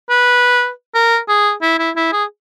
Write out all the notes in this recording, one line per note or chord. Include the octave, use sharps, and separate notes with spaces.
B4
A#4
G#4
E4
E4
E4
G#4